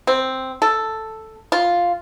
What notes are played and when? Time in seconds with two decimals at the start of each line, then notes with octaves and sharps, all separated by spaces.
0.07 C4
0.62 A4
1.52 F4